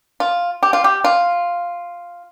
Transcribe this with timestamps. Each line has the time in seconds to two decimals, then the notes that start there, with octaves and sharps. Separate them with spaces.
0.20 F4
0.63 G4
0.73 F4
0.84 G4
1.04 F4